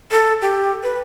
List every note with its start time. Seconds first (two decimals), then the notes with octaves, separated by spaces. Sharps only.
0.11 A4
0.41 G4
0.83 B4